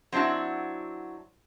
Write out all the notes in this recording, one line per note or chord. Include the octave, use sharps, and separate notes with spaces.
F#3 C4 D4 E4 F#4